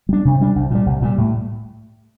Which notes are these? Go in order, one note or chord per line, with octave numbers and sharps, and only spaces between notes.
G3 D4
C3
G3 D4
C2
A#2 G3
C2
A#2 G3
A2